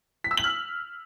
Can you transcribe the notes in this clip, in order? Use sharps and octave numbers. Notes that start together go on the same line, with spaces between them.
B6
E6
F#7
F6